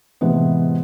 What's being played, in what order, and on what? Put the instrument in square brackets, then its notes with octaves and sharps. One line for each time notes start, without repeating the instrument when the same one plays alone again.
[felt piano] A2 C3 E3 G#3 B3